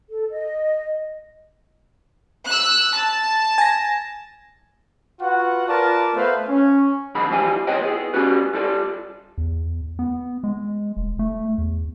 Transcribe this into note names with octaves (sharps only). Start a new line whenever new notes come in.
A4
D#5
E6 F#6
A5
G#5 A#6
F4 F#4 B4 F#5
F4 A#4 B4 D5 A5
A3 B3 B4 C5 F5
C#4
F2 G#2 D3 D#3 G#3 B5
E3 F3 G3 G#5
F4 G#4 B4 C#5 D#5 G5
B3 G#4
G3 B3 C#4 F#4 B4
G3 F4 A4 D5
E2
B3
G#3
E1
A3
E2